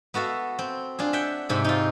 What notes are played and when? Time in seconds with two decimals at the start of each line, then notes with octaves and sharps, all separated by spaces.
0.14 B3 F#4 A4 E5 F5
0.59 C4
0.99 D4 F4 G#4
1.13 E5 F#5 G5
1.49 G#2 C3 C4 E5
1.64 D#4 F4